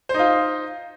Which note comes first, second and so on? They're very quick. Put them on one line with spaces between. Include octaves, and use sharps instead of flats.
C5 D#4 F4